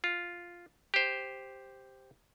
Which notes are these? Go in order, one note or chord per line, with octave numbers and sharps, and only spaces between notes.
F4
G4 C5